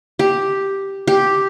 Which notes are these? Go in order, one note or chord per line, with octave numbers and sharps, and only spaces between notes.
G4
G4